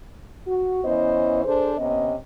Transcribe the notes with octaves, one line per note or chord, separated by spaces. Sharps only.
F#4
E3 B3 C#4 E4 C5 D#5
D4 G#4 A4 C5
C3 B3 C#4 D#5